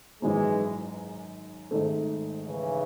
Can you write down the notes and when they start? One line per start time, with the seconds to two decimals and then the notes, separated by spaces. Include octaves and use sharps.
0.22 G#1 F#2 D#3 E3 F#3 G#3
1.71 G#1 G#2 D#3 A3
2.45 C#3 E3